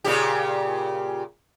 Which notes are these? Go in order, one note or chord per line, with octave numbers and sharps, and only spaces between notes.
A#2 C#3 G4